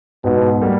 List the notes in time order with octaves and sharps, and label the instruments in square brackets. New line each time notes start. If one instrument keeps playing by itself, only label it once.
[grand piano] G#2 [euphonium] B2
[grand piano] G3 A#3